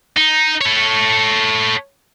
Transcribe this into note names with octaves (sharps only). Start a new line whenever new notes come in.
D#4
A4 C#5